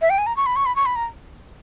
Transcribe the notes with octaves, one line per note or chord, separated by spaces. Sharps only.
E5
G5
G#5
A#5
C#6
B5
C#6
B5
C#6
B5
A#5